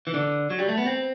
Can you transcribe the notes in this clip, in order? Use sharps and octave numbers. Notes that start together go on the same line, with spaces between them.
E3
D3
F#3
G3
A3
B3
C4